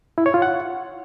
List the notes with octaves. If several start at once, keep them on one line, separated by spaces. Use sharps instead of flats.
E4
C#5
F4
F#5